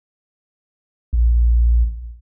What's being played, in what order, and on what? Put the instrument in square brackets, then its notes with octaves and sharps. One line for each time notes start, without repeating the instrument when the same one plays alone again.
[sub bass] A#1